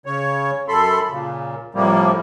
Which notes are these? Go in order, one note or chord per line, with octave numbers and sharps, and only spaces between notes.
C#3 C#5
F#2 A4 B5 C6
A#2 C#3
A2 C3 F3 G3 A#3